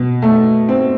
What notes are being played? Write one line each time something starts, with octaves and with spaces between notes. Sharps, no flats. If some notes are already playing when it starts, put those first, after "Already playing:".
Already playing: B2
A3
C4